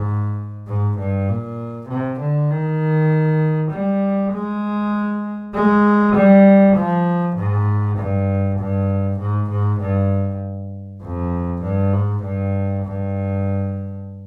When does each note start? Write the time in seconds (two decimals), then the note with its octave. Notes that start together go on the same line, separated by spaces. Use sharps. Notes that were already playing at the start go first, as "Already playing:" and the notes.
Already playing: G#2
0.67 G#2
0.98 G2
1.28 A#2
1.88 C3
2.19 D3
2.50 D#3
3.71 G3
4.32 G#3
5.54 G#3
6.15 G3
6.76 F3
7.36 G#2
7.98 G2
8.59 G2
9.19 G#2
9.50 G#2
9.80 G2
11.02 F2
11.62 G2
11.93 G#2
12.24 G2
12.85 G2